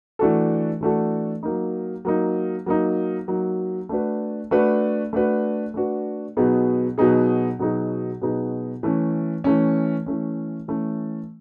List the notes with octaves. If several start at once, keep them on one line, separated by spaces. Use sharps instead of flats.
E3 A3 D4 F#4 A4
E3 A3 D4 F#4 A4
F#3 A#3 D#4
F#3 A#3 D#4
F#3 A#3 D#4
F#3 A#3 D#4
A3 D4 F#4 B4
A3 D4 F#4 B4
A3 D4 F#4 B4
A3 D4 F#4 B4
B2 F#3 B3 D#4 G#4
B2 F#3 B3 D#4 G#4
B2 F#3 B3 D#4 G#4
B2 F#3 B3 D#4 G#4
E3 A3 C#4
E3 A3 C#4
E3 A3 C#4
E3 A3 C#4